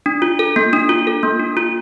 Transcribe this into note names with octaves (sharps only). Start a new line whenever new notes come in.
D4
F4
A4
A#3
D4
F4
A4
A#3
D4
F4